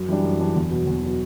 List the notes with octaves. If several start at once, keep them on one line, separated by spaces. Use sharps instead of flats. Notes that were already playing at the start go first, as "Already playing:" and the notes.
Already playing: F#2
E3 G3 D4
F#2
E3 G3 D4
E2
B2 F#3
E2
B2 F#3